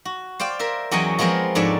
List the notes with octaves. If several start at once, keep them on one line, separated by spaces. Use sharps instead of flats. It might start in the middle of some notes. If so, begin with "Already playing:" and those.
F#4
C5 D5 F5 G5
A#4 C5 E5
E2 F#3 C#4 E4 D#5 G5
F3 G#3 B3 C4 A#4 C5
F2 G#2 D4 C#5 D5 E5